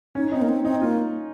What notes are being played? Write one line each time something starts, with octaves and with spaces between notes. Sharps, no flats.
C#4 D#4
C4 D#4
A#3
C4
C4 D#4
A#3 F4